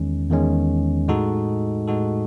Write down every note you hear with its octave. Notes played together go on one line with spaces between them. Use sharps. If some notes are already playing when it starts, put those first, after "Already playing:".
Already playing: E2 D#3 G#3 C#4
E2 D#3 G#3 C#4
A2 G#3 D#4 F#4 A4
A2 G#3 D#4 F#4 A4